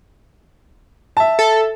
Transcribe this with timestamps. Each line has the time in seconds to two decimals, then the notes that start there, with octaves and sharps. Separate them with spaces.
1.17 E5 A5
1.39 A4